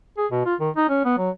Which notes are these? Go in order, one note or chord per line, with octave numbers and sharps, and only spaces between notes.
G#4
B2
F4
D#3
D#4
C#4
B3
F#3